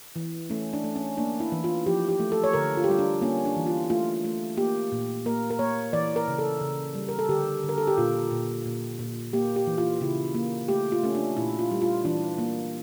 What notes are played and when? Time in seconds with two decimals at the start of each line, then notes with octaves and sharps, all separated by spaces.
0.16 E3
0.50 A3 C#4
0.73 D4
0.84 A3
0.96 C#4
1.18 A#3 D4
1.40 E4
1.52 E3
1.64 F4
1.86 F3 G4
2.09 G4
2.20 A3
2.32 A4
2.44 C#5
2.53 D3 A#4
2.77 F4
2.84 G4
2.89 G3 F4
2.99 D4
3.21 A#3 C#4
3.45 D4
3.56 E3
3.67 F4
3.90 A3 F4
4.24 A3
4.57 A#3 G4
4.92 A#2
5.26 A#3 A#4
5.50 A#4
5.59 A#3 C#5
5.93 E3 D5
6.16 A#4
6.28 C#3
6.39 A4
6.61 C#3
6.95 G3
7.09 A#4
7.19 A4
7.29 D3 G4
7.63 D3
7.69 A#4
7.78 A4
7.87 G4
7.98 A#2 F4
8.31 A#2
8.66 A#2
8.99 A#2
9.33 A#3 G4
9.56 G4
9.67 E3
9.78 F4
10.01 C#3 E4
10.35 A#3
10.68 A3 G4
10.92 F4
11.03 A3 C#4
11.15 D4
11.37 A#2 E4
11.59 F4
11.71 G3
11.82 F4
12.05 E3 D4
12.38 A#3